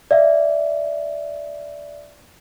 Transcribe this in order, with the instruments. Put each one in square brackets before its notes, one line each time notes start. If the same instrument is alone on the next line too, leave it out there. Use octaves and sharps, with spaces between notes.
[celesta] D5 E5 F5